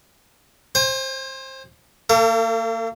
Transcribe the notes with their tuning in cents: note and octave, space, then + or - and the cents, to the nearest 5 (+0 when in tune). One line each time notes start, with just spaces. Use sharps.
C5 +20 G#5 -35
A#3 -40 A4 +35